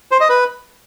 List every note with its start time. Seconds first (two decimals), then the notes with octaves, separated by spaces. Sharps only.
0.11 C5
0.20 D#5
0.29 B4